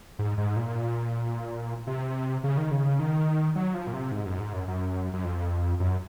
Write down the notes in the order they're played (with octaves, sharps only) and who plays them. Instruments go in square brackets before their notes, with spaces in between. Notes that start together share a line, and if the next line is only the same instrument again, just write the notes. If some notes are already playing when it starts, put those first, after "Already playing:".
[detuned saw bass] G#2
G#2
A#2
C3
C#3
D#3
C#3
D#3
F#3
F3
A#2
C3
G#2
F#2
G#2
F#2
F#2
F#2
F2
F#2